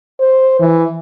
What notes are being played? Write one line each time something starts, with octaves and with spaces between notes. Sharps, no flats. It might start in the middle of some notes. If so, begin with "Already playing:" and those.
C5
E3